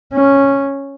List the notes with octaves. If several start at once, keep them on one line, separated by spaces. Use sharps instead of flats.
C#4